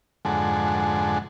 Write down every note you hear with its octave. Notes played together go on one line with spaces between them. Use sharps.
F2 G#2 D3 G#3 A4 F#5